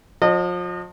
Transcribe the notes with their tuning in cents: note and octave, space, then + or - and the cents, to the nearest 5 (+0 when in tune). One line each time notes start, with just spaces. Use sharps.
F3 +35 D#5 -30